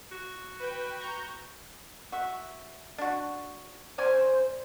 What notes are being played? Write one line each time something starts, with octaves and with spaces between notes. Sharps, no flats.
F#4
B4 G5
A#5 C#6 G6
F#4 E5
D4 F#4
C#4 C5 D5 G#5